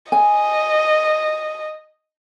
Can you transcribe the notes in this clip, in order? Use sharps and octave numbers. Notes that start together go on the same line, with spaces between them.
D#5 G#5